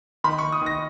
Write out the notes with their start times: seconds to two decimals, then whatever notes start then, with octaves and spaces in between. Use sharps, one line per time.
0.24 D#3 B5
0.38 D#3 C#6
0.52 D#6
0.61 D#3 A#6